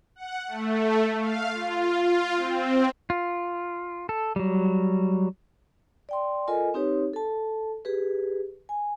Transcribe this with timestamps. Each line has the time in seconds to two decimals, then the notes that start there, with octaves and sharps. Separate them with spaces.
0.16 F#5
0.47 A3
1.19 F5
1.51 F4
2.02 F4
2.36 C4
3.10 F4
4.09 A4
4.36 F#3 G3
6.09 D5 G5 C6
6.48 F4 A4 A#4 D#5 G#5
6.74 C4 D#4 G4 B4 C#5
7.14 A4 A5
7.85 G4 G#4 B4
8.69 G#5